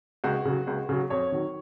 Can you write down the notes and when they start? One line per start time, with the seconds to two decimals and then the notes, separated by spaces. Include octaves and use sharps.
0.24 C#2 F#4
0.45 C#3 F#3
0.67 C#2
0.89 C#3 F#3
1.10 F2 C#5
1.32 D#3 F#3